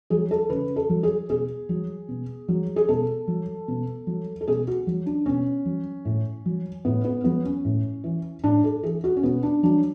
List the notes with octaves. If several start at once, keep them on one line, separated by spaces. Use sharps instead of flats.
F#3 G#4
A4
C#3 B4
A4
F#3
G#4
B2 G#4
F#3
B2
F#3
G#4
B2 A4
F#3
B2
F#3
A4
B2 G#4
F#4
F#3
D4
B2 C#4
F#3
A2
F#3
A2 B3
B3
F#3 B3
C#4
A2
E3
A2 D4
A4
E3 G#4
F#4
C#4
B2 B3
D4
F#3 D4